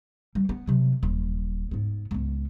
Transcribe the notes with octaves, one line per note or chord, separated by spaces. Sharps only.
G3
B3
C3 F#3
D#1
G#2 B3
C#2 B3